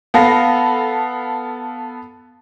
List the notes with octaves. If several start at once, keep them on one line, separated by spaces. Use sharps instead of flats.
B3 A4 F5 A#6